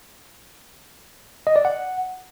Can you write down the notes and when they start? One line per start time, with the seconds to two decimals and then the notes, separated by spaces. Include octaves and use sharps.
1.47 D#5
1.56 D5
1.65 F#5